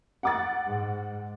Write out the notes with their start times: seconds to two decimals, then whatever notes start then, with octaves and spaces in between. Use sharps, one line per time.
0.23 F#5 D6 A6
0.65 G#2